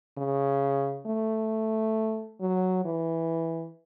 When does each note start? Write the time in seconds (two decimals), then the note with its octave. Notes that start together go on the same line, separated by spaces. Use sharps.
0.17 C#3
1.06 A3
2.41 F#3
2.85 E3